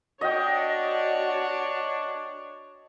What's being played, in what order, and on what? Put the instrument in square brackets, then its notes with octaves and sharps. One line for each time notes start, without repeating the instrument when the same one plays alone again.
[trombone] D4 [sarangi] F#4 [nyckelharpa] C#5 [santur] D#5 G5